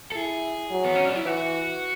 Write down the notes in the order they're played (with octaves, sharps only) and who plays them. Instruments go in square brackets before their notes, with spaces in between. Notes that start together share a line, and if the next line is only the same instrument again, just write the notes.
[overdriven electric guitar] A4
[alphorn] E4 [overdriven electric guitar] G#4
[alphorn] F#3
[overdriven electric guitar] B3
C#4
D4
E4
[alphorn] E3 [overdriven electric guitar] F#4